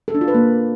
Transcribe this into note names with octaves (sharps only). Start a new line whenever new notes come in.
A4
D4
F4
B4
A#3